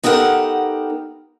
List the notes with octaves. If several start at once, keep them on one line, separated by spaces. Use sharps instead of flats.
B3 D#4 G4 A4 A#4 F#5